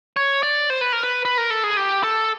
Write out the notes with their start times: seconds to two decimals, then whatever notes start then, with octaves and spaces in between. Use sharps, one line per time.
0.17 C#5
0.43 D5
0.70 C5
0.81 B4
0.92 A#4
1.03 B4
1.25 B4
1.38 A#4
1.50 A4
1.64 G#4
1.77 G4
2.03 A4